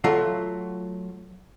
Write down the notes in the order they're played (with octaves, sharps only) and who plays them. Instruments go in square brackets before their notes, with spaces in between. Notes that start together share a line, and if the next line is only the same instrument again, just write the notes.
[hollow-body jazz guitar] F#3 A3 F4 F5